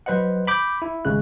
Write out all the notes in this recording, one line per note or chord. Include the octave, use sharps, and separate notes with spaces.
F#3 B4 C5 D#5 F#5
B5 D6 G6
E4
G#1 C#3 G#3 F#6